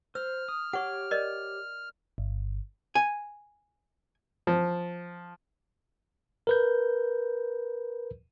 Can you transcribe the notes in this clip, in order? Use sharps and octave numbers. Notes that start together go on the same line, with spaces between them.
C5 E6 F6
D#6
G4 C#5 F#5 C#6 D6
A#4 D5 D#5
G1
G#5
F3
A#4 B4 G6